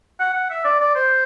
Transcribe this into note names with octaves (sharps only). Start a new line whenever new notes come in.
F#5
F#5
E5
D5
D5
C5